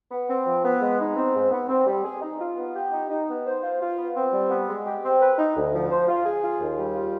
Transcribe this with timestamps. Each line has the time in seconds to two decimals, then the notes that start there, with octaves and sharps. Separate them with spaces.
0.11 B3
0.28 C4
0.46 F3
0.64 B3
0.81 G#3
0.98 D#4
1.16 C4
1.34 G#2
1.51 B3
1.68 C4
1.86 G3
2.04 G#4
2.21 D#4
2.40 F4
2.57 B3
2.74 G4
2.91 D#4
3.09 D#4
3.28 B3
3.45 C5
3.62 F4
3.80 F4
3.97 B3
4.15 C4
4.32 G3
4.50 B3
4.68 G#3
4.86 G4
5.03 C4
5.20 B4
5.38 D#4
5.56 D2
5.73 F3
5.91 C5
6.08 F4
6.25 G#4
6.43 F4
6.60 D#2
6.78 G3
6.95 F4